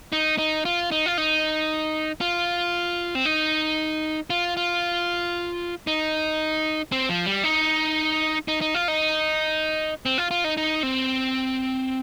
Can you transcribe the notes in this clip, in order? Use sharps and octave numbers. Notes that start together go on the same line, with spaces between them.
D#4
D#4
F4
D#4
F4
D#4
F4
C4
D#4
F4
F4
D#4
C4
F3
G3
D#4
D#4
D#4
F4
D#4
C4
F4
F4
D#4
D#4
C4